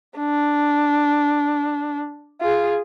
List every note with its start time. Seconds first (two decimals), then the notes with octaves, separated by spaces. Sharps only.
0.18 D4
2.41 F4 G#4